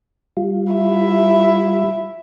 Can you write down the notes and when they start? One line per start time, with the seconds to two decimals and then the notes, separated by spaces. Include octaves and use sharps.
0.37 G3 F4
0.73 E4 E5